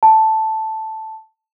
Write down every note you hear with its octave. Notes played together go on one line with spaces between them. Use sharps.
A5